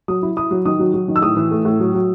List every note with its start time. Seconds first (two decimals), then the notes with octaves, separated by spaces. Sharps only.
0.08 F#3 D#6
0.23 E4
0.37 E4 D#6
0.51 F#3
0.66 D#3 D#6
0.79 F#3
0.94 F#3
1.08 D#3
1.16 E6
1.22 A2 D#6
1.37 E3
1.51 A3
1.65 A2
1.80 F#3
1.94 F#3